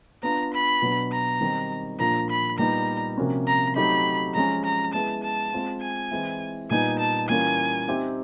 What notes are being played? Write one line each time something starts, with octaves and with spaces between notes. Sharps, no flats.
B3 D4 F4 A#5
B5
B2 F#3 B3 D4
A#5
D#3 G3 C4 D#4
A#2 F3 A#3 D4 F4 A#5
B5
A#2 G3 B3 D#4 A#5
C3 F3 A#3 C#4 F#4
A#5
F#3 A3 C4 D#4 G4 B5
F3 G#3 C#4 A#5
A#5
G#3 B3 E4 G#4 A5
A5
G#3 C4 F4
G#5
E3 G#3 C4 E4
A#2 G3 B3 D#4 G#5
A5
E3 G3 A#3 C#4 F4 G#5
C4 D#4 G4 C5 E5